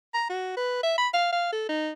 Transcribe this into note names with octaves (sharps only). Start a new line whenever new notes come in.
A#5
F#4
B4
E5
B5
F5
F5
A4
D#4